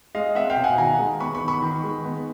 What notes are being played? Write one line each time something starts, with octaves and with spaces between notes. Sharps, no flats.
G#3 D#5 F5
C4 E5 F#5
F5 G5
B2
F#5 G#5
D#3 G#5 A#5
G#3
B3 B5 C#6
B5 C#6
D#3
B5 C#6
D#3
G#3
B3